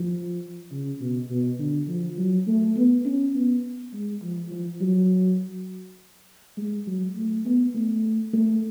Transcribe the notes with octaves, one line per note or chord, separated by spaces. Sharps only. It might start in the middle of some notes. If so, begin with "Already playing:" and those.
Already playing: F3
C#3
B2
B2
D3
F3
F#3
A3
B3
C#4
B3
G#3
F3
F3
F#3
G#3
F#3
A3
B3
A3
A3